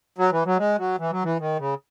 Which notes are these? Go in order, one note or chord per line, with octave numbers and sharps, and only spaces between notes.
F#3
E3
F#3
G#3
F#3
E3
F#3
E3
D#3
C#3